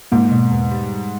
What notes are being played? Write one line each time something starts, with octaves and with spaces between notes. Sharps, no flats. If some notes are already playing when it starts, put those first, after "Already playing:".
G#2 A#3
B2
E2
G3